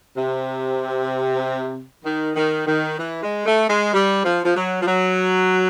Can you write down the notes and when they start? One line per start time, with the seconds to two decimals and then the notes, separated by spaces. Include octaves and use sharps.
0.16 C3
2.05 D#3
2.36 D#3
2.67 D#3
2.99 E3
3.23 G#3
3.46 A3
3.69 G#3
3.93 G3
4.24 F3
4.45 F3
4.56 F#3
4.82 F3
4.87 F#3